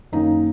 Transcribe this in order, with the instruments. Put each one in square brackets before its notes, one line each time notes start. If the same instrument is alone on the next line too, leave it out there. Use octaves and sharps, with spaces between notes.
[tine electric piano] F#2 D#3 A#3 C#4 [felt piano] D#4